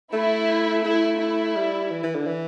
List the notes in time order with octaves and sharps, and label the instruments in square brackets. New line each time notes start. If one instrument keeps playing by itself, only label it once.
[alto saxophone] A3 [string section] E4
[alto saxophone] A3 [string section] E4
[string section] E4
[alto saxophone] G3
E3
E3
D3
E3